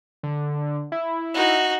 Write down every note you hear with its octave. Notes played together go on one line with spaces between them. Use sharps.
D3
E4
D#4 F#4